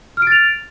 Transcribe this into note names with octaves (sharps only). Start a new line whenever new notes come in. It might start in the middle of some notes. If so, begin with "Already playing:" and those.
F6 A6 D7 F7